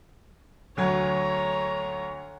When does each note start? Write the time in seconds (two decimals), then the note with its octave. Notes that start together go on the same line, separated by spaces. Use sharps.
0.77 D2 F#3 C#5 A#5 G#6